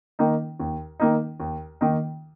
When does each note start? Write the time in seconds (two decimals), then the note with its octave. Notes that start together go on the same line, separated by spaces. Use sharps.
0.19 D#3 A#3 D#4
0.60 D#2
1.00 D#3 A#3 D#4
1.40 D#2
1.81 D#3 A#3 D#4